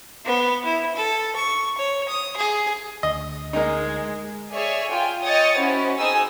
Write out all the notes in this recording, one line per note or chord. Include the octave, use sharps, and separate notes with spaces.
B3
E4
A4
C#6
C#5
D#6
G#4
D2 D#5
G#3 A#3 D#4
G#4 C#5 D5 E5
F4 G5 G#5
C#5 D#5 G5 D#6 A6 C#7
C#4 E4 F#4 C5
C4 D#4 G#4 G#5 D#6 E6